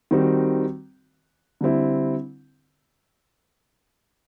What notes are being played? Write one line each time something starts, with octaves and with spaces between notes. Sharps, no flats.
D#3 G3 C4 D#4 F#4
D3 G3 C4 E4